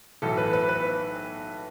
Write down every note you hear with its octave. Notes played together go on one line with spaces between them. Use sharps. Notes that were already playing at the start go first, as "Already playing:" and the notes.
B1 A2 E3 A4
B4
B4
B4